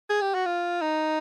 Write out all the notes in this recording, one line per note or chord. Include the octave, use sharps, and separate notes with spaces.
G#4
G4
F#4
F4
D#4